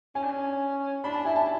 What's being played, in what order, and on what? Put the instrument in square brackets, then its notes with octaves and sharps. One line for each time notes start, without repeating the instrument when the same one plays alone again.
[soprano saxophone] C#4 [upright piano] G#5
[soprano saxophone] D4
C#4
[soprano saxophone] D4 [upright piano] B5
[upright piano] A5
[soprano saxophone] E4 [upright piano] G#5
[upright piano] A5